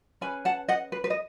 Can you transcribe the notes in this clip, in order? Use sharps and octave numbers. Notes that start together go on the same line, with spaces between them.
C#4 G#4 B4 G#5 B5
F#5 A5
D#5 F#5
B4
B4
D#5